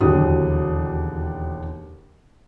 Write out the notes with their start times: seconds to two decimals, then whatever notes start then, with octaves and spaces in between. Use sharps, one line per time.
0.01 E1 D#2 D3 F#3 G4 D#6